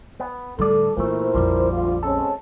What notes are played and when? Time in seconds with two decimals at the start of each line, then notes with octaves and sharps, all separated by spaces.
0.20 B3
0.59 D2 A2 G3 A4 D5
0.97 A#2 E3 A3 B3 E4 A#4 C5
1.34 A#1 F2 F3 G3
1.72 D2 F4
2.03 G#3 C4 C#4 A4